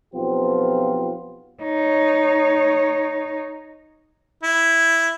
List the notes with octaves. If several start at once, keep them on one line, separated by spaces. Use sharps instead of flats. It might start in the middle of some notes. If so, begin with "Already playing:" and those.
B1 F3 B3 C4 F4 G4
D#4 C#5
E4